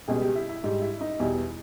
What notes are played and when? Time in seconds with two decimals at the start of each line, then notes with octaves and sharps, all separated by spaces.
0.08 C#2 B2 G3 G#4
0.21 G4
0.35 E4
0.49 E4
0.64 G#2 G3 G4
0.82 E4
1.01 D#4
1.19 E2 B2 G3 E4